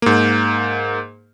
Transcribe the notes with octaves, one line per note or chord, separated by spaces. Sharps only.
G#2 A#3